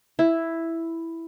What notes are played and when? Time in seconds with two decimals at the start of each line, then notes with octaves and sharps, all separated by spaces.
0.19 E4